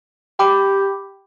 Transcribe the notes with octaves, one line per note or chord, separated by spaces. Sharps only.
G4 G5 B5 D6